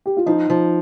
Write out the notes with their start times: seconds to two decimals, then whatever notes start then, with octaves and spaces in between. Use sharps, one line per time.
0.06 G4
0.17 F4
0.26 F3 D#4
0.50 F3